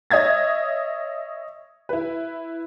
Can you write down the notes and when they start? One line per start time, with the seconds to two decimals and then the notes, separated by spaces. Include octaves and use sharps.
0.11 C#5 D#5 E5 G#6 A6
1.89 E4 B4